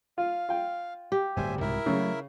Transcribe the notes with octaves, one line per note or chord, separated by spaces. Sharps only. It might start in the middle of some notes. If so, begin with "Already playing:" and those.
F4 F5
F4 G5
G4
D1 G1 G3 C5 E5 G#5
C2 G#2 B2 E4 A#4 E5
C#3 F#3 A3